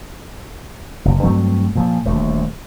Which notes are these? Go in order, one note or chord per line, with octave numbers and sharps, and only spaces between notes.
F#1
G2 F#3 A3 C4
A#2 F3
D#1 D2 A3